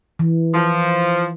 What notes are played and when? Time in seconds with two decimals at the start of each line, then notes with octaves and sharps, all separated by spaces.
0.19 E3
0.54 F3